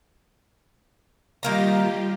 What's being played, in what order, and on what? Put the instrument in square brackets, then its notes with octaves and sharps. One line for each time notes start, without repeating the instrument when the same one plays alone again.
[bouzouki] D#3 A#3 A#5 [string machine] G3 F4 G4